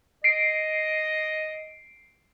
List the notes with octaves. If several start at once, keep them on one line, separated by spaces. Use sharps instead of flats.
D#5 C7 D7